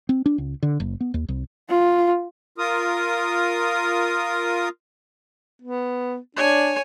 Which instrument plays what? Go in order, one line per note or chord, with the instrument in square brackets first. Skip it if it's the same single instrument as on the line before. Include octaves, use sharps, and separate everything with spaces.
[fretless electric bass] C4
D4
C#2
D3
F#1
B3
D#2
C2
[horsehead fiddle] F4
[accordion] F4 A#4 D#6
[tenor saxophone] B3
[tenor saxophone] D4 [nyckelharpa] C#5 G#5